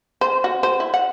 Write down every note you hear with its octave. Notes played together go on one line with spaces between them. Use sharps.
C5
F#4
C5
E4
F#5